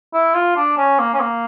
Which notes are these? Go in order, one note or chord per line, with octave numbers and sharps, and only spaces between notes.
E4
F4
D4
C#4
A#3
C#4
A#3